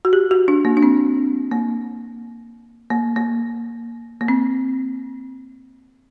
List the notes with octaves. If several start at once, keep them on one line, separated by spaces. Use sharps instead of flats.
F#4
G4
F#4
D4
A#3
D4
C4
A#3
A#3
A#3
A#3
C4